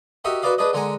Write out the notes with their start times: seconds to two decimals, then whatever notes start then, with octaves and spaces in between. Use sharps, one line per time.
0.25 F#4 G4 A#4 D#5 E5 F#5
0.42 F#4 A#4 B4 D5 D#5 F5
0.58 D4 G#4 B4 D5 D#5
0.73 D3 G#3 A#4 F#5 G#5 A#5